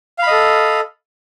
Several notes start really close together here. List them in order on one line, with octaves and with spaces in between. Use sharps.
F5 B5 D#5 A4